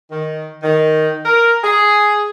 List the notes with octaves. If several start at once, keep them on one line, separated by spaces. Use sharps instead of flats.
D#3
D#3
A#4
G#4